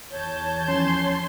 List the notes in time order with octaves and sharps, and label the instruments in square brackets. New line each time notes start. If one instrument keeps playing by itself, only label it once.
[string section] E2 A5 G6 [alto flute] C#5
[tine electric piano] F3 C#4 [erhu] C6